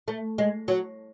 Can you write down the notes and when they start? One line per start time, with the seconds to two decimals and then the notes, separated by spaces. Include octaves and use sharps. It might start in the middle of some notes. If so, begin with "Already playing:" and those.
0.08 A3
0.38 G#3
0.68 F#3